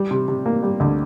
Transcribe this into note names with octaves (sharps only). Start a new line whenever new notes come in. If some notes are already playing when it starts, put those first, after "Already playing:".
Already playing: G3
C3
C3
A#3
G3
D2